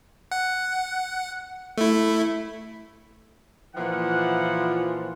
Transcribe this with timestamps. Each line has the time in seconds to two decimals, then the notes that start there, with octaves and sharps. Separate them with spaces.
0.31 F#5
1.78 A3 E4
3.76 A#2 E3 F3 F#5